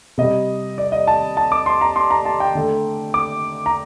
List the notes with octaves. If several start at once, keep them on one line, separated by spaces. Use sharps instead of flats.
C3 G3 D#5
D5
D#5
A5
A5
D6
C6
A#5
C6
A#5
A5
G5
D3 A3
D6
A#5